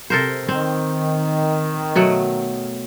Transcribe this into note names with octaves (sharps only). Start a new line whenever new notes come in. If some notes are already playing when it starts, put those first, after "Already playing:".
C3 A4 A#4 C5
D#3 C4
B2 F#3 A3